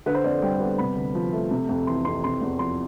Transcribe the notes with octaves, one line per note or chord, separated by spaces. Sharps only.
D3 B4
C5
F2 D5
G3 G5
B3
C3 B5
D2
F3
A3
C3
F2
E3 C6
F2 C6
C3 C6
E2
F3 C6